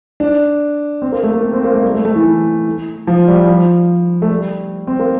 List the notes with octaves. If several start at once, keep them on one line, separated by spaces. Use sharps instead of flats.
D4
C4
A#3
A3
A#3
C4
C4
A#3
A3
G3
A3
A3
E3
F3
G3
F3
A3
G3
C4
A#3